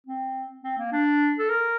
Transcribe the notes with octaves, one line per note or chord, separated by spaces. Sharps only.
C4
C4
A#3
D4
A4
A#4